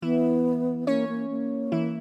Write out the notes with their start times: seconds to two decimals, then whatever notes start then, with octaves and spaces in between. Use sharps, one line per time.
0.02 E3 B3 E4
0.87 A#3 C#4 C#5
1.09 A#3
1.30 A#3
1.72 E3 E4